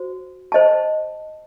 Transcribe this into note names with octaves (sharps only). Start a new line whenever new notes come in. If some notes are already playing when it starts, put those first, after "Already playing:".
Already playing: F#4 C5
C5 D#5 A5